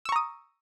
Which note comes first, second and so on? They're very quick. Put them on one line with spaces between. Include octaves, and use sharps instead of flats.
E6 C#6 A#5 D#6